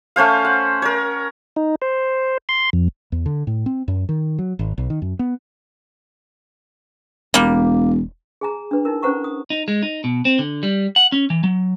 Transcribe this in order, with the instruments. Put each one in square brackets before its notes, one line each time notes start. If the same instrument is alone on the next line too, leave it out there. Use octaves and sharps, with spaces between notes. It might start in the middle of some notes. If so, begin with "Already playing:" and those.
[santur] A3 C#4 C5 F5
F#5
A#4 C#5
[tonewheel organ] D#4
C5
C6
F2
[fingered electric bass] E2
D3
A2
C4
F#2
D#3
F#3
G#1
B1
D#3
F#2
B3
[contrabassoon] E1 [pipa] G3 A#3
[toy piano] G#4 G#5 A#5
D4 B4
D#4 E4 A#4
C#4 B4 C5 F#5 A#5 C#6
D#6
[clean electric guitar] D#4
G#3
D#4
B2
C4
D3
G3
F#5
C#4
E3
F#3